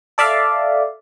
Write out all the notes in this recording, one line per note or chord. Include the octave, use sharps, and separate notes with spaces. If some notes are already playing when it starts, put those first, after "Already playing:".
A4 D5 E5 F5